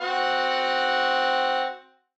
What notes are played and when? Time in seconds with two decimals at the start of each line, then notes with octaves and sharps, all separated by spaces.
0.01 C4 F#4 F#5